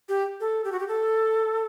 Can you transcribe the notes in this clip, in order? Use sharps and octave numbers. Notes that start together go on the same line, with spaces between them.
G4
A4
G4
F#4
G4
A4